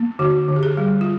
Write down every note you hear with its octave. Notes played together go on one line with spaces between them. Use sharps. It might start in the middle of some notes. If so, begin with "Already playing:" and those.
Already playing: A#3
D3 F#4
D3
G4
G#4
G3
F4